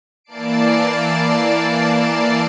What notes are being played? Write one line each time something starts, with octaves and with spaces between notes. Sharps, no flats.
E3 A#3 D5 A5 C7 D7